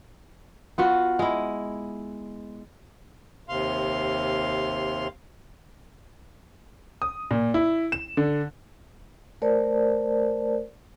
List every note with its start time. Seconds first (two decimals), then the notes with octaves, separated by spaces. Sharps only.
0.78 B3 F4 F#4
1.19 G#3 E4
3.49 D#2 C3 F5 C6
7.02 D#6
7.31 A#2
7.54 E4
7.92 E7
8.17 D3
9.42 A3 A#4 C5 D5 A5